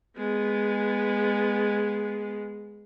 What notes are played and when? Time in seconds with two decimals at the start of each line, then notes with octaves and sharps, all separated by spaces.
0.17 G#3 B3